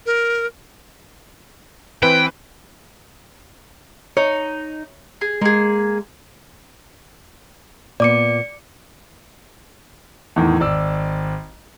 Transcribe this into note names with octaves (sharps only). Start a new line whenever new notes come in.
A#4
E3 C4 B4 G5
D#4 C#5
G#4
G#3 A#3 G#4
A#2 B3 D5 D6 C#7
E2 A2 D#3 E3
G#1 D5 E6